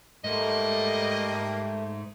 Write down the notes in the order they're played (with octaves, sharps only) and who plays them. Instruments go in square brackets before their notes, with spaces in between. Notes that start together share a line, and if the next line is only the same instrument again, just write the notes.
[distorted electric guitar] G#2 [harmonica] G3 A#3 [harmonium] A3 [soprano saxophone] D#5